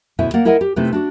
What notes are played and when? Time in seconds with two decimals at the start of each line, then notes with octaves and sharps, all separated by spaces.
0.19 D2 B2 E4 C5 E5 G#5
0.34 A#3 D5 F#5
0.45 E4 A#4 D#5 E5 F#5 G#5
0.61 G4
0.76 C3 A3 C4 D#4 E4 B4
0.93 D4 F#4 D5